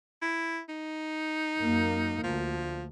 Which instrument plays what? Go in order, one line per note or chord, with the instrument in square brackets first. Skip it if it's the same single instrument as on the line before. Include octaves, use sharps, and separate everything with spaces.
[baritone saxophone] E4
D#4
[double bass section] F#2 A#3
[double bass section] D2 [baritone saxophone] F3